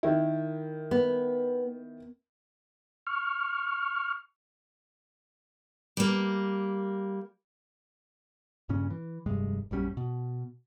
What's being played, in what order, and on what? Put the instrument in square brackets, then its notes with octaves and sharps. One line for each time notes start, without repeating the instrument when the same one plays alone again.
[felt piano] D#3 E4
[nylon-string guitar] B3
[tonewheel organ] C#6 F6
[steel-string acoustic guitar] G3 A#3
[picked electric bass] G2 A#2 C#3 C#4
E3
F1 C2 G2 G#3
A#1 F#2 G3 C#4
B2